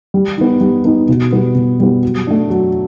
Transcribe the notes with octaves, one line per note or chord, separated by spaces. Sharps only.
G3
B3 D#4
G3
B3 D#4
B2
G3 B3
B2
G3 B3
F#3
A3 D4
F#3